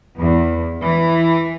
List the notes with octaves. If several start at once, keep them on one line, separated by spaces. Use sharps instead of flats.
E2
E3